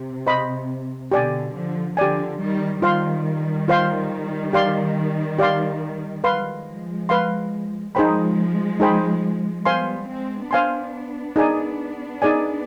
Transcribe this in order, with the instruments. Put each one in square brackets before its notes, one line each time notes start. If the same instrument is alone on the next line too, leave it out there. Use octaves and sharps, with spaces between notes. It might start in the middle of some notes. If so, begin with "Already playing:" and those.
Already playing: [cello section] C3
[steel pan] C5 D#5 B5
[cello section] B2 D3 [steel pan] G4 D5 G#5
[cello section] D3 F3
[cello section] D3 F3 [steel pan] G4 D5 G#5
[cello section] D#3 G3
[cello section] D#3 G3 [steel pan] F4 C5 F5 C6
[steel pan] F4 C5 F5 C6
G4 D5 F5 C6
G4 D5 F5 C6
[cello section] F3 G#3 [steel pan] B4 F5 C6
[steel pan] B4 F5 C6
[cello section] F3 G#3 [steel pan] D#4 G#4 C5 G5 B5
[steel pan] D#4 G#4 C5 G5 B5
[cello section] G3 B3 [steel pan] C5 F5 G#5 C6
[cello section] G#3 C4
[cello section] B3 D4 [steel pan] C5 F5 G#5 C6
[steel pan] D#4 G#4 D5 G#5
D#4 G#4 D5 G#5